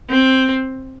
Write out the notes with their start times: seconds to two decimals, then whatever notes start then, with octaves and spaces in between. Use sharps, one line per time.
0.10 C4